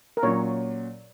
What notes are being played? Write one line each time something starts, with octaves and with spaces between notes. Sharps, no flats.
A#4
A#2 F#3 C#4 C#5